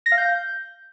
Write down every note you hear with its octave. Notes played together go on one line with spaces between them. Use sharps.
A#6
F5
G6